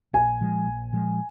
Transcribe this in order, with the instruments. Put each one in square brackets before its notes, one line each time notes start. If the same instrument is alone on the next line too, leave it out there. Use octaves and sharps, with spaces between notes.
[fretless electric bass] A#1 [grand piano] G#5
[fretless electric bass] A#2 F3 G#3
A#1
A#2 F3 G#3